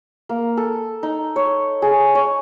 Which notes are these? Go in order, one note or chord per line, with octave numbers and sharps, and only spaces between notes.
A#3
A4
D#4
C#5
G#4
C#5